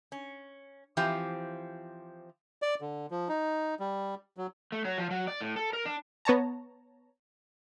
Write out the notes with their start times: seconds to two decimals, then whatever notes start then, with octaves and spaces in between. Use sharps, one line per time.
0.12 C#4
0.97 E3 F3 C4 G4
2.62 D5
2.81 D3
3.11 F3
3.29 D#4
3.80 G3
4.37 F#3
4.72 A3
4.85 F#3
4.98 F3
5.11 F#3
5.28 D5
5.41 A2
5.56 A4
5.73 A#4
5.85 D4
6.25 B3 C#5 A5 A#5